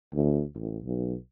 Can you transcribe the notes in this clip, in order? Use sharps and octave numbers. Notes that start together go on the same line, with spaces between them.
D2
A1
B1